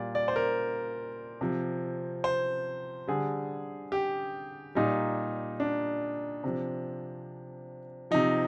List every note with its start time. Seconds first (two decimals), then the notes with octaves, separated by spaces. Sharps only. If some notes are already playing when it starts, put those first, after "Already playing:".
Already playing: A#2 G3 D5
0.15 D5
0.28 C5
0.36 A#4
1.41 C3 F3
2.24 C5
3.08 D3 G3 G#4
3.92 G4
4.75 A#2 G3 D#4
5.60 D4
6.44 C3 F3
8.11 C3 F3 D#4